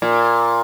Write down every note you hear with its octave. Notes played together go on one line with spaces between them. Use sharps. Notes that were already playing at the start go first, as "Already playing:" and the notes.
A#2